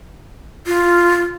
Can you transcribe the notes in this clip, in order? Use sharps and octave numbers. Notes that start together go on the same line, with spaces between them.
F4